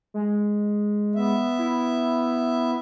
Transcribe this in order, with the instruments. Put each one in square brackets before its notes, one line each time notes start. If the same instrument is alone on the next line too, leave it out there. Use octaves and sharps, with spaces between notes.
[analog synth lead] G#3
[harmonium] B3 E5
[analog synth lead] E4